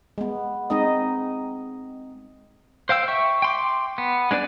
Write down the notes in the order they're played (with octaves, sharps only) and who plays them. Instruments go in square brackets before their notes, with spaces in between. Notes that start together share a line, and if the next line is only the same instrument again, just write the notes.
[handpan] G#3 B3
G#3 C4 D#4 D#5
[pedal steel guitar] C5 F5 G5 E6
E5 G5 C#6
G5 C6 D6
B3
G#3 D4 B4 D5 G#5